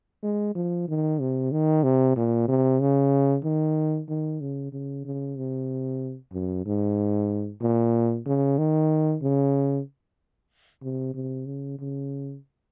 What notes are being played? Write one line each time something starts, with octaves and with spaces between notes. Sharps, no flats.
G#3
F3
D#3
C3
D#3
C3
A#2
C3
C#3
D#3
D#3
C#3
C#3
C#3
C3
F#2
G#2
A#2
C#3
D#3
C#3
C3
C3
C#3
C#3